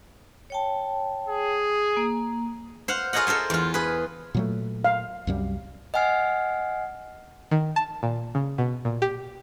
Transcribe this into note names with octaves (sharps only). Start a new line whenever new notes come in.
C#5 G5 A5
G#4
A#3
C5 F5 F#5
F4 G#4 A#4 C#5 D#5 F#5
A4 A#4 C5 G#5
E2 F4
G#4 B4
A#2 F#3 A3
F5
C2 F#2 G3
D#5 F#5 G#5 F6 C7
D#3
A5
A#2
C#3
B2
A#2
G4